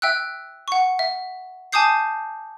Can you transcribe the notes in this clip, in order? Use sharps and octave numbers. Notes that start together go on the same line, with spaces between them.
E5 G5 E6 F#6
F#5 C#6
E5
G#5 A5 D6 D#6 G6 C7